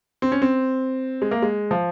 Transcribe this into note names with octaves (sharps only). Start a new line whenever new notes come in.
C4
C#4
C4
G#3
A#3
G#3
F3